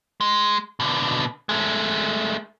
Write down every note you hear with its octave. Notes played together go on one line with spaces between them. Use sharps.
G#3
B2 D3
G#3 A3